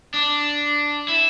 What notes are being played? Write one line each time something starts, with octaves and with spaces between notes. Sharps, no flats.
D4
E4